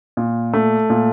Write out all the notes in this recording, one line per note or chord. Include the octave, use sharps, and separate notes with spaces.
A#2
A3
A#2